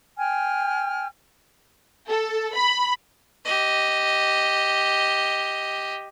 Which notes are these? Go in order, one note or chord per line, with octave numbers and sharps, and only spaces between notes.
G5 G#5 F6
A4
B5
G4 D#5